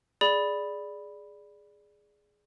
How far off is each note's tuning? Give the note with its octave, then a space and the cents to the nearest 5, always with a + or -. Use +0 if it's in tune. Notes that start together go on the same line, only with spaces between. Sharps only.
G#4 +0 D5 +0 B5 +0